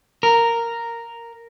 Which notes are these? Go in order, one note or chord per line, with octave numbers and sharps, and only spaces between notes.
A#4